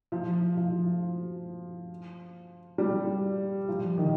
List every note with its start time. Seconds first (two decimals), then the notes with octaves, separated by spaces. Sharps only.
0.12 F3
0.57 F3
2.78 G3
3.68 F3
3.98 D#3